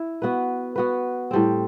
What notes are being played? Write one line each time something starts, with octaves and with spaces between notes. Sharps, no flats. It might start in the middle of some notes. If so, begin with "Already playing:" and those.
Already playing: E4
B3 F#4 B4
B3 F#4 B4
A2 G3 C4